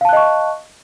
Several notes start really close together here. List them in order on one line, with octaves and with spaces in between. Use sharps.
F5 A5 F#6 D#5 C#6